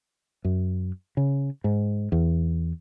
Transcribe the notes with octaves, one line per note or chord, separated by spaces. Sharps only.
F#2
C#3
G#2
E2